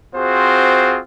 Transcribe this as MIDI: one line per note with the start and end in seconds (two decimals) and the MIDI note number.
0.16 1.00 60
0.16 1.00 65
0.16 1.00 66
0.16 1.00 68
0.16 1.00 72